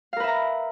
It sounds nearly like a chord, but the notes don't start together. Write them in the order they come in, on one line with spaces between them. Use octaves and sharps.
F5 A#4 B4 E5 A#5